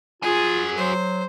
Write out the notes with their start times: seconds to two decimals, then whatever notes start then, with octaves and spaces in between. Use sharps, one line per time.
0.22 F4 F#4 G#4 G#5
0.77 F#3 C5